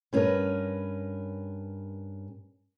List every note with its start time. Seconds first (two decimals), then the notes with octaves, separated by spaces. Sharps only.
0.13 G2 C#4 E4 G#4 A#4 B4